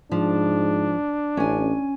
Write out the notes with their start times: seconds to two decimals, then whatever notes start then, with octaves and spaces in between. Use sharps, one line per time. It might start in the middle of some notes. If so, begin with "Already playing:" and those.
0.12 G#2 F3 D4
1.37 A1 C#4 G#5